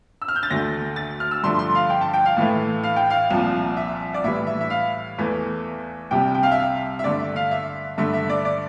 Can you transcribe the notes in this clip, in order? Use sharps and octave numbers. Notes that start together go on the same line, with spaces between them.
E6
F6
G6
A6
D2 D3 A3 A#6
A6
F6
E6
G2 D3 F3 A3 C6
C6
F5
G5
A5
G5
F5
A2 E3 A3
F5
G5
F5
C2 A#2 F3
E5
D5
A2 E3 G3 E5
E5
E5
F5
E2 E3 A3
C2 C3 G3 G5
G5
F5
E5
F5
E5
G2 D3 A3 D5
E5
F5
E5
G2 D3 A3 E5
E5
D5
D5